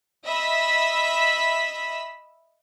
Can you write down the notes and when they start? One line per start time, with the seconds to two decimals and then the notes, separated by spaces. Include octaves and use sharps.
0.24 D#5 E5 B5 E6 B6